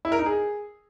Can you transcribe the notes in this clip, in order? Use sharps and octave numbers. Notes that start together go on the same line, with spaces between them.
E4
A#4
D#4
G#4